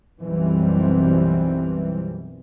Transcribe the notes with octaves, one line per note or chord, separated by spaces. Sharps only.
B1 F#2 E3 G3 C4